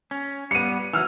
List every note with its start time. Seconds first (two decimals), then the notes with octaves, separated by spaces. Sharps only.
0.11 C#4
0.51 G3 B3 C#7 D#7
0.93 E3 F#3 E6 F6